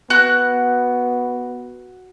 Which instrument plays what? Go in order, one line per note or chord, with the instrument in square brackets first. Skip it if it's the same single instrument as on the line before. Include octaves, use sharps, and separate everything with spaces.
[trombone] B3 [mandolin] F#4 F#6